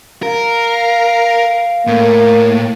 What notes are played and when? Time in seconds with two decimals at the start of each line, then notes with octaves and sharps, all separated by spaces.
0.23 A#4 F5
1.87 A2 A#3